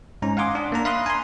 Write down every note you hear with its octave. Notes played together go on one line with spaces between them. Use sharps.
G#2 C#4 A#5
F5 F#5 G#5 C6 D6 D#6
D4
A#3 D4 A#5
E5 F5 B5 C6 D#6 F#6
G#5 A#5 C6